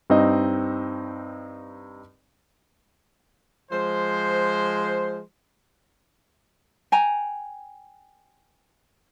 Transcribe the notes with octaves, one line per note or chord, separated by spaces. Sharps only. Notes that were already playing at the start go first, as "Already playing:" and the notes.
G2 C4 D#4 D#5
F3 G#3 C5
G5 G#5 A#5